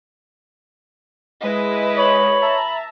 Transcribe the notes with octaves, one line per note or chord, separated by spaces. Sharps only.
G#3 E4 B4 D#5
C#5 B5
E5 A5 A#5